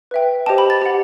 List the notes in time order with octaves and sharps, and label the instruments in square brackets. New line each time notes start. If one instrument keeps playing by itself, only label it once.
[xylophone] B4 E5 G5
G4 C5 D#5 G5 A5
B5
A6
G4 D#5 F#5